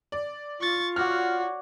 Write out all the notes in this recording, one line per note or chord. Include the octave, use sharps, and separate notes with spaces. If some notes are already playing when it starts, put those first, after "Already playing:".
D5
F4 C#6 A6
F#4 C#5 D5 F#5 F6